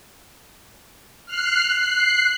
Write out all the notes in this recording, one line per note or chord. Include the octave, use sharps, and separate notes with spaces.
F6 F#6 C7
F#6 C7